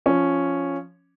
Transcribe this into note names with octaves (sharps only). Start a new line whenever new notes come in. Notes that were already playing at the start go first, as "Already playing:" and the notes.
F3 C#4